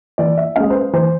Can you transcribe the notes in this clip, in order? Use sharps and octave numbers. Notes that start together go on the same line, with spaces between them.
E3 D5
E5
G#3 C#4 F5
C5
B4
E3 C5